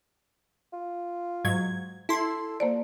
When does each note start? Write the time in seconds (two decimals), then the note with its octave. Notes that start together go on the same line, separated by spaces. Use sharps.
0.73 F4
1.45 G#2 F#3 G#6
2.09 E4 A4 C6
2.60 F3 A#3 C5 D5